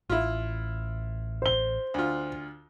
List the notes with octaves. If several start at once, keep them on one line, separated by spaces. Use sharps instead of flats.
A1 E4 F4
C5 G7
D2 F4